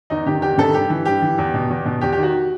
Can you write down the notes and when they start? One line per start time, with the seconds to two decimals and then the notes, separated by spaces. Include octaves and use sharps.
0.10 E2 D#4
0.26 C3 D#3 G4
0.42 E2 G4
0.58 C3 D#3 A4
0.74 G2 G4
0.90 E3
1.05 G2 G4
1.22 E3
1.38 E2
1.54 B2
1.70 E2
1.85 B2
2.01 E2 G4
2.12 G4
2.17 D#3
2.23 F#4